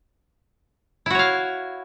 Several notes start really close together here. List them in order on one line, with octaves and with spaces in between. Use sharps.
E4 F#4 C#5 F5